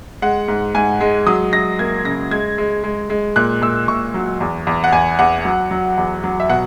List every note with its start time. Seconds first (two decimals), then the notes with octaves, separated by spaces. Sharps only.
0.22 G#3 F#5
0.48 G#2
0.75 G#2 G#5
1.01 G#3
1.27 F#3 D#6
1.53 F#3 A#6
1.79 A#3 G#6
2.05 C#3 A#6
2.31 G#3 G#6
2.58 G#3
2.84 G#3
3.10 G#3
3.36 A#2 F#6
3.62 A#2 E6
3.88 A#2 C#6
4.14 F#3
4.41 E2
4.67 E2
4.84 F#5
4.92 E2 G#5
5.19 E2 F#5
5.45 F#3
5.71 F#3
5.97 E2
6.24 F#3
6.40 E5
6.49 B2 F#5